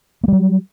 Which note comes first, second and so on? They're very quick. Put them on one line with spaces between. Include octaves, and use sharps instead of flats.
A#3 G3 F#3